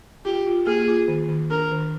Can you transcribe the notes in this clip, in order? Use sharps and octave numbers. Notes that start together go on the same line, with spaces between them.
F4 G4
F4
A#3 G#4
F4
D#3
D#3
D4 A#4
D#3